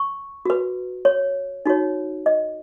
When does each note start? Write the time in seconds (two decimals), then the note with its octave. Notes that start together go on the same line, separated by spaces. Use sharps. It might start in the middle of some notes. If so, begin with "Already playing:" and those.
Already playing: C#6
0.45 F#4 B4
1.05 C#5
1.66 D#4 F#4 C#5
2.26 D#5